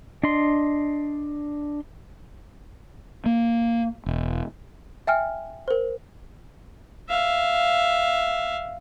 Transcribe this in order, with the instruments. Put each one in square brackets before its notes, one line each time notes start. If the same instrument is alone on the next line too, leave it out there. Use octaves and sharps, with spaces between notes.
[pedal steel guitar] D4 D#5 C6
[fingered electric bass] A#3
E1
[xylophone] E5 G5 G#5 F6
A#4 C5
[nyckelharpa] E5 F5